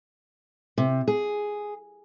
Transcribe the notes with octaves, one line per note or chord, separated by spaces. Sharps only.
C3
G#4